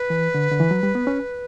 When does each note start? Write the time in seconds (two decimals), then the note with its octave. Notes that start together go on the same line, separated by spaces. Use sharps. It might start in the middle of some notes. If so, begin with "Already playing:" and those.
Already playing: B4
0.10 E3
0.34 D3
0.51 D3
0.60 E3
0.71 F#3
0.83 G3
0.95 B3
1.07 C#4